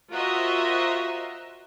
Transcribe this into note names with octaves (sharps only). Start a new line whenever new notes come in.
F4 F#4 A#4 C5 D#5 E5